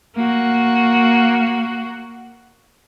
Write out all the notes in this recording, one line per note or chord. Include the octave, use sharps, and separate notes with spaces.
A#3 F#4